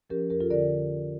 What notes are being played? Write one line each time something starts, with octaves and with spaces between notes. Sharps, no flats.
F3 C#4 G4 A#4
F2 G4 A#4
F4 A4
D3 A#4 D5